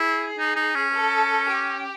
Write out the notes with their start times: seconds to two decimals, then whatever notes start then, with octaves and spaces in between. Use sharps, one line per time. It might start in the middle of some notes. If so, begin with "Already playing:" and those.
Already playing: E4 G#4
0.38 D#4
0.56 D#4
0.75 C#4
0.94 A4
1.49 G4